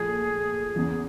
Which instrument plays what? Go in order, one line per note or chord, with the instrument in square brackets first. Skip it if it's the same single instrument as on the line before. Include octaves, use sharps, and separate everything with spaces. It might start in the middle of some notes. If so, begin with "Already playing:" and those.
Already playing: [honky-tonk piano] A#2 F3 A3 [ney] G#4
[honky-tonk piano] E2 C#3 E3